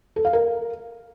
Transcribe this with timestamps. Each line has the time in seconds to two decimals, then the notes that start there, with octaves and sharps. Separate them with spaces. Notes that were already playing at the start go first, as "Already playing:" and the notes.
0.16 A4
0.25 F5
0.33 A#4